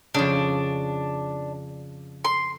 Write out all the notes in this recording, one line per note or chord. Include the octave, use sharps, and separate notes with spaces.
F2 C#3 D4
C6